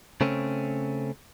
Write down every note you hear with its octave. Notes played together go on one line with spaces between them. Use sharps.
C#3 A3 C4 C#4